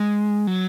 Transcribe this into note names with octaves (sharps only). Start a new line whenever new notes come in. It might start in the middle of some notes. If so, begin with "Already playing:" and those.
Already playing: G#3
F#3